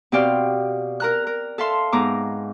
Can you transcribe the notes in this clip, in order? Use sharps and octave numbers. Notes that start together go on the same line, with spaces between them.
B2 C4 G4 D5 F5 G5
A#4 A#5 F#6
A#4
A4 E5 F5 C6
G#2 B3 A#5 D6